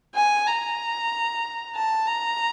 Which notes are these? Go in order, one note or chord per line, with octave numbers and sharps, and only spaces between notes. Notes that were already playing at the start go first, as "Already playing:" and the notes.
G#5
A#5
A5
A#5